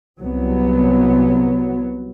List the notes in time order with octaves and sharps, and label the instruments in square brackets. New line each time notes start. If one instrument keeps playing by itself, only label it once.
[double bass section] C2 F#3 B3